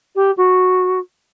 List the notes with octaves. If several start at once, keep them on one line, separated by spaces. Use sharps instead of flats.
G4
F#4